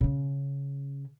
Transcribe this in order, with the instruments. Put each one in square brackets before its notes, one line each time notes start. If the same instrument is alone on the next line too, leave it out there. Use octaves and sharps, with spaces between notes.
[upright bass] C#3 C#4